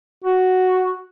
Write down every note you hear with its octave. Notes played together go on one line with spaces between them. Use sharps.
F#4